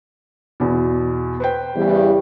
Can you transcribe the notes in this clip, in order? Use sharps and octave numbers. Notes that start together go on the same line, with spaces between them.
E2 B2
B4 C5 G5
E2 C#3 G3